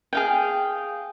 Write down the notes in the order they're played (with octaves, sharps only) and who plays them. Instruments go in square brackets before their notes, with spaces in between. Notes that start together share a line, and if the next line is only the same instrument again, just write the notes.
[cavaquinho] G#4 F5 G5